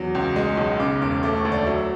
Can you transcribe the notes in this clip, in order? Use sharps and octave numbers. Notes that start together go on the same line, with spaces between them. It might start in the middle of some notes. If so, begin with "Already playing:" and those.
Already playing: E2 F#3
C#2
G#3
B1
C#3 D6
E1 D6
A3 D6
C#6
D2
D5
F#3 E5